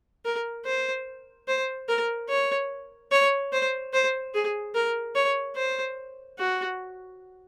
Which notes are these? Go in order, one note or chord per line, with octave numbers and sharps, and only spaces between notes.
A#4
C5
C5
A#4
C#5
C#5
C5
C5
G#4
A#4
C#5
C5
F#4